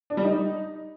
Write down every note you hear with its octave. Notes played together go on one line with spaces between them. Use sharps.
D4
G3
D#4